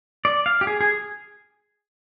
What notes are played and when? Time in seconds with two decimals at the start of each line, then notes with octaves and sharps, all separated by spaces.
0.25 D5
0.46 F5
0.61 G4
0.67 G#4
0.81 G#4